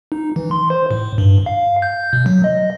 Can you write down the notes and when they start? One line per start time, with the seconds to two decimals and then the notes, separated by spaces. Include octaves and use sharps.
0.12 D#4
0.36 E3
0.51 C6
0.70 C5
0.91 A2
1.18 G2
1.46 F5
1.82 G6
2.13 B2
2.26 F#3
2.44 D#5